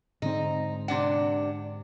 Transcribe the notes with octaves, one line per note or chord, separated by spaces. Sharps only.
G#2 D3 C4 D#4
C3 D4 F#5